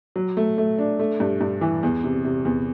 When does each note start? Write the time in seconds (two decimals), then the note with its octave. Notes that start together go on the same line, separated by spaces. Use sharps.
0.16 F#3
0.37 A3
0.58 A3
0.78 D4
0.99 A3
1.20 G2
1.41 G2
1.61 E3
1.83 E2
2.04 C3
2.24 C3
2.45 E2